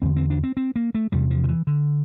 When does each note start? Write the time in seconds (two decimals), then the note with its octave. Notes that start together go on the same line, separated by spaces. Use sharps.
0.02 E2 D3 C4
0.16 C4
0.30 D4
0.43 C4
0.57 C4
0.76 A#3
0.95 A3
1.12 E2 C3 G3
1.30 F3
1.44 D3
1.49 E3
1.67 D3